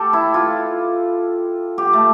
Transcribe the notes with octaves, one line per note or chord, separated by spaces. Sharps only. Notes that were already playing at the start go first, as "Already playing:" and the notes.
Already playing: G4 A4
E4
F4
G4
A3